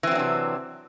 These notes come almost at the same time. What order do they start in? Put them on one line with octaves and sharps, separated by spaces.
E3 C4 F#3 D4 C3